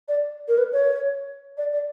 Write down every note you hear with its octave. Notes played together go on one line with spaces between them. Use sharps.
D5
A#4
B4
C#5
D5
D5